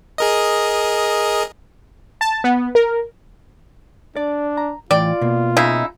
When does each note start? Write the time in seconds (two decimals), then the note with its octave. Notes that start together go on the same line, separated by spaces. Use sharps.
0.18 G#4 A#4 D#5
2.21 A5
2.44 B3
2.75 A#4
4.16 D4 D5
4.57 A#5
4.91 A2 E3 F4 D5 G5
5.21 B2 A#3
5.57 C#3 D#4 E4